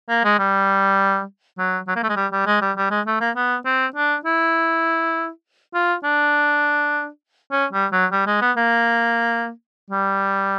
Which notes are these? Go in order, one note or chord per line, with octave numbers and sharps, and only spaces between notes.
A#3
G#3
G3
F#3
F#3
A#3
A3
G#3
G3
G3
G#3
G3
G3
G#3
A3
A#3
B3
C4
D4
E4
F4
D4
C#4
G3
F#3
G3
G#3
B3
A#3
G3